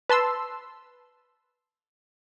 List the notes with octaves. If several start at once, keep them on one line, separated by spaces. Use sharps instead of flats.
B4 A5 C6 E6